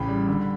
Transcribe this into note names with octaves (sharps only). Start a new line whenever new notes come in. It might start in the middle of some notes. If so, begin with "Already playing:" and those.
Already playing: A1 C#3 G5 B5
G3
D3